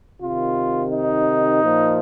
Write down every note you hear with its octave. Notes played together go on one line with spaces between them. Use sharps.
C3 D#3 F4
D#4
A#2 F3